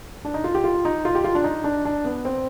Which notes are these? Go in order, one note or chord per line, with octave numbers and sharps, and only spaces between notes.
D4
D#4
F4
G4
F4
D#4
F4
G4
F4
D4
D#4
D4
D4
B3
C4